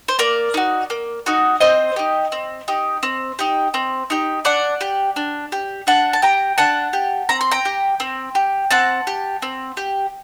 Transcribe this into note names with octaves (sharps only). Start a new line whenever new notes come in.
C5
A#3 A#4 D5
D#4 F#4
A#3
D#4 F#4
C4 C5 D#5
D#4 G4
C4
D#4 G4
C4
D#4 G4
C4
D#4 G4
D4 D5 F#5
G4
D4
G4
D4 F#5 A5
A5
G4 G5 A#5
D4 F#5 A5
G4
C4 A#5
C6
G5 A#5
G4
C4
G4
C4 F#5 A5
G4
C4
G4